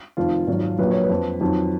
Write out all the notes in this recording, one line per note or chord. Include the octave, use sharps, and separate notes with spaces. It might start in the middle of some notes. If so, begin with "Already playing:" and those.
F1 F2 D#3 F4
G#1 G#2 F#3
A#1 A#2 F#3 B4
C#5
B4
F2 F3
F2 D#3 F#3